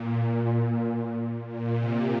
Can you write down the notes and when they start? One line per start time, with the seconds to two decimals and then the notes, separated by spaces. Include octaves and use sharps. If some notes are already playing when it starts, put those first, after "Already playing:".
Already playing: A#2
0.22 A#2
1.47 A#2
1.78 C3